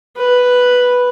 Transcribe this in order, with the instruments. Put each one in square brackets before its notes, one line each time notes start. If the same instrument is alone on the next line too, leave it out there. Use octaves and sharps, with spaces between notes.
[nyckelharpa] B4